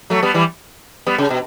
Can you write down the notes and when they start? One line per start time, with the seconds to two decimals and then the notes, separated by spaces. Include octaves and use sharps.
0.10 F#3 A3
0.23 G3 B3
0.34 E3 G3
1.07 G3 B3
1.18 C#3
1.30 B2